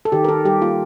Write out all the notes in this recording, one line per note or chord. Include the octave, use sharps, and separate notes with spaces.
A4
D#3 G4
A#4
D#3 A4
G3 G4
A#3 F4